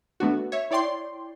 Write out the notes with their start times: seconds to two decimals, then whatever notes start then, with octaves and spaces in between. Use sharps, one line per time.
0.20 A3 B3 D4 F#4
0.52 C#5 E5
0.71 E4 C#5 D5 G5 C6